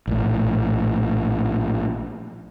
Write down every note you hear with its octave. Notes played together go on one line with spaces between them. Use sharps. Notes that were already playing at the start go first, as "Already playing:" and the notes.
A#1 A2